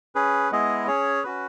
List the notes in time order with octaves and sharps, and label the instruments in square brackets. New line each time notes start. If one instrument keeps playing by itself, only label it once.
[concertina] C#4 G#4 B4
G#3 B3 E4 G#4 D#5
C#4 G#4 C#5
C#4 F#4 B4